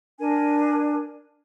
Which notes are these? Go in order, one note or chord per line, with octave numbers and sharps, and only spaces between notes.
D4 A#4 G#5